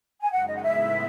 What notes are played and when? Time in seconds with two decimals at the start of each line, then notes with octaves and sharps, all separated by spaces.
0.22 G#5
0.32 F#2 C#3 G#3 D#4 F#5
0.47 D#5
0.56 F#5
0.62 A2 G#3 B3 E4 E5